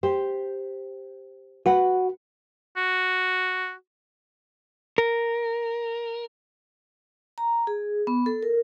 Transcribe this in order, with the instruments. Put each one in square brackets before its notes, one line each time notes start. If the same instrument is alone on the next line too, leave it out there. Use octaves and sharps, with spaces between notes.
[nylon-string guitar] G4 C5
[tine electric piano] F#4 [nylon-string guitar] B4 F#5
[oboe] F#4
[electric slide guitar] A#4
[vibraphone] A#5
G#4
B3
A4
A#4